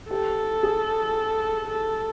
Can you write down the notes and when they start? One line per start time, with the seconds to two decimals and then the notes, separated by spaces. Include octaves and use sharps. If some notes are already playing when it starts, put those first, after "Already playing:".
0.10 G4 A4
0.63 G#4
1.69 A4